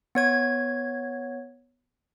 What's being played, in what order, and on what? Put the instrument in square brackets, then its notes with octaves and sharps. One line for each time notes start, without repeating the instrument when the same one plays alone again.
[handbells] B3 C#5 G#6